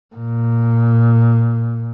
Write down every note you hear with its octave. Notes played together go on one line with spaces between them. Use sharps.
A#2